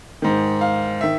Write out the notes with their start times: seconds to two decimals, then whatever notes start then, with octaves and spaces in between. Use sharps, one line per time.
0.22 G#2 D#3
0.61 F5
1.01 D#3 E5